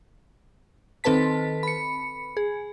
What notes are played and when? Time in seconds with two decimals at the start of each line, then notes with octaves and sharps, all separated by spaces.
1.04 D#3 C4 A4 B4 A5 B6
1.63 B5 C#7
2.37 G#4